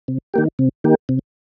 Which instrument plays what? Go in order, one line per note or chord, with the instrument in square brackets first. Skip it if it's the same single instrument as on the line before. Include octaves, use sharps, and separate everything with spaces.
[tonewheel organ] C3
D#3 A#3 G4
C3
D#3 A#3 G4
C3